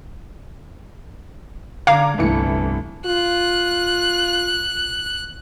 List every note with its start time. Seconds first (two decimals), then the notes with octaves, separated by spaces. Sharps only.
1.87 D3 F5 A#5 D6 G#6
2.18 G1 C2 E3 A3 C#7
3.05 F4 F#6